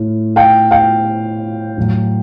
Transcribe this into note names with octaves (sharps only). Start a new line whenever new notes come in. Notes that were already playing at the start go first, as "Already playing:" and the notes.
Already playing: A2
F5 G5
F5 G5
A2 F#3